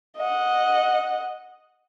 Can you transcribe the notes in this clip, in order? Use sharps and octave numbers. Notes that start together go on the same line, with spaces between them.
D#5 F#5